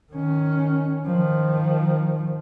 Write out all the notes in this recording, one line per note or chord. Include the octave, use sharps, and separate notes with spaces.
D#3 C#4
D#3 F3